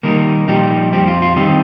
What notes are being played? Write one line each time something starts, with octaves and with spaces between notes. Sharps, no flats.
D#3 G3 A#3 D#4 A#4
A#2 F3 G3 D#4 G4
F2 F3 G3 C4 G4
F4
F4
D#3 G3 C4 D#4 G4